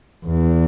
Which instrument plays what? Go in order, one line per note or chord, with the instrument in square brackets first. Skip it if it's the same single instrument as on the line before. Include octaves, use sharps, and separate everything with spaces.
[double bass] E2